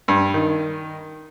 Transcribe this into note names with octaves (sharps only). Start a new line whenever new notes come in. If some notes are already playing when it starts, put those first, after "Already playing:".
G2
D#3